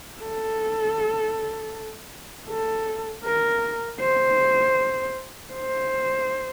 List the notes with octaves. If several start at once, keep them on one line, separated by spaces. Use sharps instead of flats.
A4
A4
A#4
C5
C5